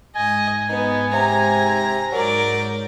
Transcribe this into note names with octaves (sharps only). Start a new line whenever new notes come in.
G#2 D#5 G#5
B3 D#4
C3 A#5
G#2 F#3 A#4 D5 G6